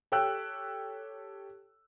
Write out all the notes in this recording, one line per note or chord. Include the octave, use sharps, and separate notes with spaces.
G4 A4 C#5 G5 E6 F#6